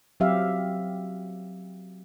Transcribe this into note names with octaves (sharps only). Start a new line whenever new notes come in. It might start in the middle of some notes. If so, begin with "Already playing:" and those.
F#3 C4 G4 E5 F5